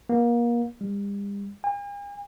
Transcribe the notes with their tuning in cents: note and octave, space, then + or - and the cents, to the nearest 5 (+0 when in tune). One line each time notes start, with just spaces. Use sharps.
A#3 +30
G3 +40
G#5 -45